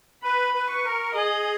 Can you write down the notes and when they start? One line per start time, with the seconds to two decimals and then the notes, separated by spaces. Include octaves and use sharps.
0.23 B4 B5
0.54 B4
0.69 C#6
0.84 A#4
1.14 G#4 D#5